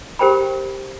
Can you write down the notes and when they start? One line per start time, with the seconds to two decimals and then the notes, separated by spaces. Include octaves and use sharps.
0.19 G4 A#4 C5 G5 B5